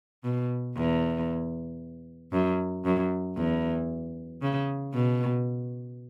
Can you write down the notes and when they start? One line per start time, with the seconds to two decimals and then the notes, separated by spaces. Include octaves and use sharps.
0.24 B2
0.77 E2
2.33 F#2
2.85 F#2
3.37 E2
4.42 C#3
4.94 B2